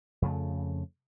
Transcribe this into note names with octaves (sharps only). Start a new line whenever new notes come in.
F2 C#3 A3